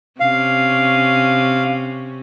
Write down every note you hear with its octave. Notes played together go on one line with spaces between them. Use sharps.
C3 C#4 F5